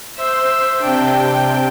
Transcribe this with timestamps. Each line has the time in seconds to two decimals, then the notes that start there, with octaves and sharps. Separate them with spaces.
0.17 C5 E5
0.81 C3 D4 G5